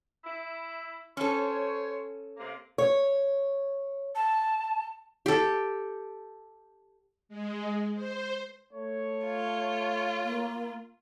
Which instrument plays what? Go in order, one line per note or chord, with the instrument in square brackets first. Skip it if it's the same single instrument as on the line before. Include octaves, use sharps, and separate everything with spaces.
[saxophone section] E4
[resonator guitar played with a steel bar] C#4 A4 [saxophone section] C5 C#5
[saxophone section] C3 A#3
[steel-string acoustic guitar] C#5
[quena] A5
[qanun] G4 A4
[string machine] G#3
C5
[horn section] A3 C#5
[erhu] F4
[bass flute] A#3